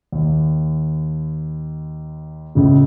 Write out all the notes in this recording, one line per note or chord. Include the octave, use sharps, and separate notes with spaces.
D#2
C#2 A2 C#3